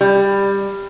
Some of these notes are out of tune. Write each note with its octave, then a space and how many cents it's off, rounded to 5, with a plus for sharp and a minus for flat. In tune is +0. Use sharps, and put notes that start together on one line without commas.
G3 +15